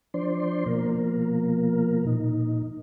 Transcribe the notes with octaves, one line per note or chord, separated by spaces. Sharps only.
F3 D4 C5 D5 C6
B2 F3 A#3 A#4
A#2 D#4